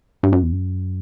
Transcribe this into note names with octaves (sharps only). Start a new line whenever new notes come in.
G2
F#2
E2
F#2